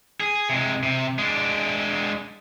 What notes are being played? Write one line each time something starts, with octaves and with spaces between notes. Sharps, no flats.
G#4
C3 G#3
C3
G#3 D4